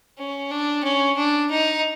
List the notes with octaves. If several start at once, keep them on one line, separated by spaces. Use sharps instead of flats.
C#4
D4
C#4
D4
D#4